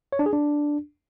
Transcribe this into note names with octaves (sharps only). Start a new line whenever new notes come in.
C#5
D4
G#4
D4